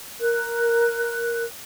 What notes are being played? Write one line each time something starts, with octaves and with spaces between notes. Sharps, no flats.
A#4 F#6